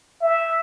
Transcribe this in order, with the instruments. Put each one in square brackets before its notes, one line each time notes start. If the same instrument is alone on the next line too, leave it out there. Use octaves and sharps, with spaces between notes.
[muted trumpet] E5